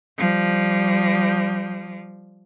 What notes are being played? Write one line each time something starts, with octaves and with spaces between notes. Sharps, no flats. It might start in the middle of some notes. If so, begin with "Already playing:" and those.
F3 G3